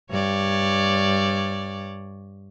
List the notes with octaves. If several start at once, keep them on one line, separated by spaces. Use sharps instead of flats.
G2 C#5 D5